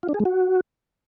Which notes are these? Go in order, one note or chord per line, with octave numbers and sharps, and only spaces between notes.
F4
D4
G#4
G#3
F#4